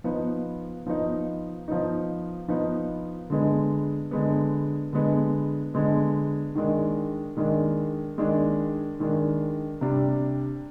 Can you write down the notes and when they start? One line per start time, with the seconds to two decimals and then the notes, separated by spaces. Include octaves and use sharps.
0.04 F3 B3 D#4
0.86 F3 B3 D#4
1.68 F3 B3 D#4
2.48 F3 B3 D#4
3.30 D3 G#3 B3
4.11 D3 G#3 B3
4.93 D3 G#3 B3
5.74 D3 G#3 B3
6.55 D#3 G#3 D4
7.37 D#3 G#3 D4
8.18 D#3 G#3 D4
9.00 D#3 G#3 D4
9.81 C3 G3 D4